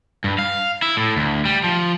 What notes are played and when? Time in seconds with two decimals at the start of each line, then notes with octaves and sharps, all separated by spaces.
0.24 G2
0.39 F5
0.82 E4
0.97 A2
1.17 D2
1.45 G3
1.64 F3